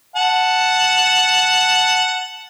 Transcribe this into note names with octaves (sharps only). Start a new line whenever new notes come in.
F#5 A5